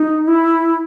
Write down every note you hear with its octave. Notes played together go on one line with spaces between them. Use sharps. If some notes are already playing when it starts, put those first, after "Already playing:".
Already playing: D#4
E4